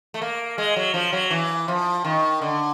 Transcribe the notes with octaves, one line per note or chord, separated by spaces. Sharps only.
A3
A#3
G#3
F#3
F3
F#3
E3
F3
D#3
D3